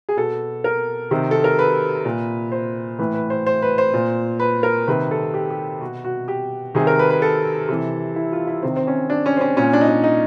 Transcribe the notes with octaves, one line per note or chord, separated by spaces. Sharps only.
G#4
B2 A4
A#4
C3 D#3
A4
A#4
B4
A#2
C5
A2 E3 B4
B4
C5
C5
B4
C5
A#2
B4
A#4
C3 D#3 B4
A4
G4
G4
B2 F#4
F#4
G4
C3 D#3 G#4
A#4
B4
B4
A4
C3 E3
E4
F4
E4
C3 D#3 C4
C4
C#4
D4
C#4
C4
C#4
A#2 C#4
D4
D#4
D4
D#4